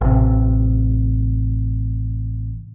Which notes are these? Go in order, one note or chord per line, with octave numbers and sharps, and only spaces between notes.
A1 C3